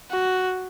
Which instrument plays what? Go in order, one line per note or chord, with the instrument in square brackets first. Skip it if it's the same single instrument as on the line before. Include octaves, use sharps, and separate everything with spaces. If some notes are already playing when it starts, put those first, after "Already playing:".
[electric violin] F#4